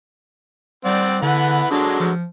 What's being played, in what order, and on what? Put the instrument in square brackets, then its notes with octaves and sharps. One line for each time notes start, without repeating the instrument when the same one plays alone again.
[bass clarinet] G3 [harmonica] C4 D5 F#5
[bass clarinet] D3 [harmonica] E3 F#5 B5
[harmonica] D3 F#3 G#3 [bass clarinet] D4
[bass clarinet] F3